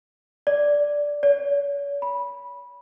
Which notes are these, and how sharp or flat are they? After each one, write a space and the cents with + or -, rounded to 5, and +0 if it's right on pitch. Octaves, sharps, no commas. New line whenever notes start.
D5 -5
C#5 +40
B5 -15